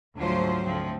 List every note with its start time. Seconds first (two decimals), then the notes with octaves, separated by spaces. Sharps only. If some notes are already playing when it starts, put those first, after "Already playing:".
0.15 D2 G#2 F3 F#3 F4 C5
0.64 D2 F3 C4